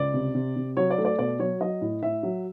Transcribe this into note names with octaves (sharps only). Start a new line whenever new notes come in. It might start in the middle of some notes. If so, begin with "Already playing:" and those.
Already playing: C#2 D5
C3
C3
C3
F#3 C#5
D5
A3
D5
B2 D5
F#3 C#5
F#3 D#5
A2
A2 E5
F#3